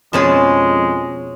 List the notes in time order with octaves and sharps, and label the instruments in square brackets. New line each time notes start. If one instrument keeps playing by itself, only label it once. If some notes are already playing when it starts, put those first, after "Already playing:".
[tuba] F2 [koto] B2 F3 G#4 [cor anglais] G#3 [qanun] C#4 A5